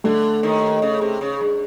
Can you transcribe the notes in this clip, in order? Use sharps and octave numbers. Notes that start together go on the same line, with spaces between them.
D3 A3
D#2 D#3
C#3
C3
C#3
G2